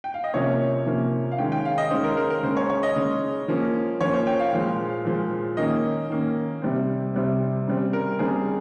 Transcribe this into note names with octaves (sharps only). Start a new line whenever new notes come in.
G5
F5
D#5
C3 F3 A#3 C#4 C#5
C3 F3 A#3 C#4
F5
D#3 G#3 C#4 G5
G5
F5
D#5
D#3 G#3 C#4 C5
A#4
A#4
A#4
C#3 G#3 C#4 C5
C#5
C#5
D#5
C#3 G#3 C#4
F3 A#3 C#4
F3 A#3 C#4 C#5
C5
G5
F5
A#2 F3 G#3
A#2 F3 G#3
D#3 A#3 C#4 D#5
D#3 A#3 C#4
C3 G3 C4
C3 G3 C4
C#3 G3 C4
A#4
C#3 G3 C4 G#4